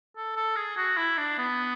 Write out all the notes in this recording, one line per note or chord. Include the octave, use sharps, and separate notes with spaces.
A4
A4
G#4
F#4
E4
D4
B3